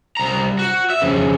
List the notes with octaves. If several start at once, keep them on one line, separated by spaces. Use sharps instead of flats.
C2 A#5
F#4
E5
F2 C#3